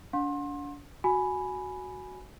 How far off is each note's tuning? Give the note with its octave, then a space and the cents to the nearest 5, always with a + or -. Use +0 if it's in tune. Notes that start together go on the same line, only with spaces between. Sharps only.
D4 -35 F#5 -40 C6 +30
F#4 +0 G#5 +10 B5 +0